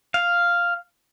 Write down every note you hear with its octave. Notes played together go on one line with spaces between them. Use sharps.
F5